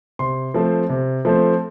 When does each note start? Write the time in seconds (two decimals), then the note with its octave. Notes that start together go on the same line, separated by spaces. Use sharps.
0.19 C3 C6
0.54 F3 A3 C4
0.89 C3
1.25 F3 A3 C4